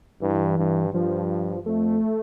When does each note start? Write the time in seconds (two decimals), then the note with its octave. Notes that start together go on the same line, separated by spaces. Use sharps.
0.22 G2 E3
0.58 G2
0.94 G2 F3
1.66 F2 A3